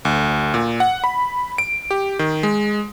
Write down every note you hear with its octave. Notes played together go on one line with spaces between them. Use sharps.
D2
A#2
F#5
B5
D7
G4
D#3
G#3